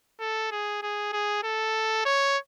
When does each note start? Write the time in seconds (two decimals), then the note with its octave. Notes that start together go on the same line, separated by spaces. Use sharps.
0.20 A4
0.51 G#4
0.82 G#4
1.12 G#4
1.43 A4
2.05 C#5